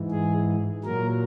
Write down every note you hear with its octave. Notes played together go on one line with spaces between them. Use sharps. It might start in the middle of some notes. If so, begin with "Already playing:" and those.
Already playing: G#2 E3
G#4
A#2 F#3 A#4